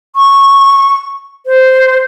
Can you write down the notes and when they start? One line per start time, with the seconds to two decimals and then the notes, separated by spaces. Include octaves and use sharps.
0.16 C#6
1.46 C5